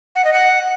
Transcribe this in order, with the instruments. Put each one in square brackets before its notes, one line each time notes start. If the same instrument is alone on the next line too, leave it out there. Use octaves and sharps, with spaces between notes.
[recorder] F#5
D#5
F#5